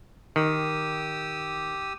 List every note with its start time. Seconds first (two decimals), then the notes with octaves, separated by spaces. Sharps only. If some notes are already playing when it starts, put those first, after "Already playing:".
0.36 D#3 G4 D#6 E6